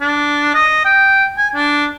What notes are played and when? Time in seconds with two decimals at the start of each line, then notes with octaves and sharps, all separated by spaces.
0.01 D4
0.54 D#5
0.85 G5
1.38 G#5
1.55 D4